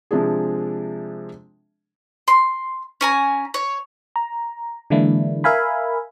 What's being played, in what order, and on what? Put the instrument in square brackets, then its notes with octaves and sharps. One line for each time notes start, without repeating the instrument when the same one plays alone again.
[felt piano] C3 F3 G#3 D4 G#4
[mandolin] C6
C#4 G#5 A#5
C#5
[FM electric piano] A#5
D3 E3 G#3 A#3 D4 E4
A#4 E5 F5 G#5 B5